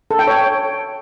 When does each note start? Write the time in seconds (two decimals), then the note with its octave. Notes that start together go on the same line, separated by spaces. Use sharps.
0.11 A4
0.19 G5
0.27 C#5